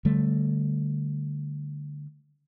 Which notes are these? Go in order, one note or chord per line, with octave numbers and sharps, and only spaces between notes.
D3 G3 A3